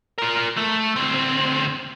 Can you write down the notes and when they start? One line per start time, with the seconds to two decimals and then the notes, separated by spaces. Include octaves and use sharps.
0.18 F4 A#4
0.57 A3
0.96 D2 C4